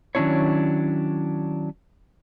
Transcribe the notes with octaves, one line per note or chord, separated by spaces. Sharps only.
D#3 F#3 C#4 D4 E4 C#5